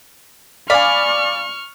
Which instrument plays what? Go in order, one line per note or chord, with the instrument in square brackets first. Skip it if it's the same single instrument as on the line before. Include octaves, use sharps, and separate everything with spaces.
[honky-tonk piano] D5 G#5 [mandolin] F5 B5 [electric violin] C#6 F6